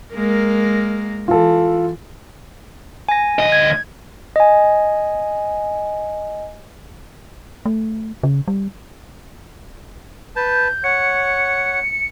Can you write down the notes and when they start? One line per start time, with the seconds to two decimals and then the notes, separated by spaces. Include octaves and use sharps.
0.14 G#3 A#3 A#4
1.28 E3 F4 A4
3.09 G#5 A#6
3.39 D2 D#5
3.52 G#6
4.36 D#5 G#5
7.66 A3
8.23 C#3
8.48 G3
10.36 B4 A5 G6
10.84 C#5 F#5 C#7